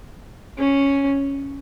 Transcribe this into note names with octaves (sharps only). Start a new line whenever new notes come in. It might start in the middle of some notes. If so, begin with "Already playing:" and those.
C#4